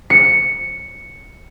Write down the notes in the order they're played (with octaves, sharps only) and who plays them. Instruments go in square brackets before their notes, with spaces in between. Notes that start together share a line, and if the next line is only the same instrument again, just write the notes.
[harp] C#7